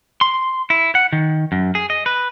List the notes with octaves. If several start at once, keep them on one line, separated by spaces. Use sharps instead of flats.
C6
E4
F#5
D#3
F#2
G#4
D#5
B4